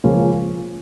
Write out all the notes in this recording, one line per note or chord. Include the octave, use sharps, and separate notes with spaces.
C#2 C#3 F3 A#3 C#4